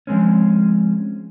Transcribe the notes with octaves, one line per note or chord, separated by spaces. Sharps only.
F3 G#3 C4 C#4